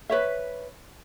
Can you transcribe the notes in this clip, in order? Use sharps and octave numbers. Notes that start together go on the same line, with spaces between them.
B4 C#5 E5